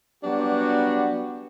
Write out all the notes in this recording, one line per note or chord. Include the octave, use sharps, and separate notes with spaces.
F#3 G3 B3 D4 F#4 G4